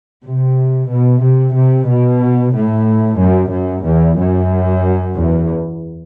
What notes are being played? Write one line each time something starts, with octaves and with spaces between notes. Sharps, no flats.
C3
B2
C3
C3
B2
A2
F#2
F#2
E2
F#2
E2